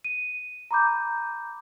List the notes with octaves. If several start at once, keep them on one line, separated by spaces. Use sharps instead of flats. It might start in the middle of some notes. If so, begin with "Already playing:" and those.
D#7
A#5 B5 D6 G6